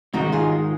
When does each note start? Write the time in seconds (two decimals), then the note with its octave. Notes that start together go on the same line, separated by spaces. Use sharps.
0.13 G#2 D#3 G#3 D#4 F#4
0.32 F4 G#4